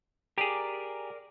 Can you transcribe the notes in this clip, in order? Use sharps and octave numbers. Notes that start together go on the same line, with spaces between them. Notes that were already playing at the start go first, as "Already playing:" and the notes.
G4 G#4 A#4 D5